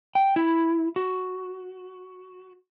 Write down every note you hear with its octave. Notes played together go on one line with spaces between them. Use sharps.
G5
E4
F#4